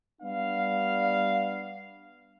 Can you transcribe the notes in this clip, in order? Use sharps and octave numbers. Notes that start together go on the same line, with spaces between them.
G3 B3 D4 F5